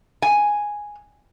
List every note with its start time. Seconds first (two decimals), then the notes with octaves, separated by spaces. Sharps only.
0.22 G#5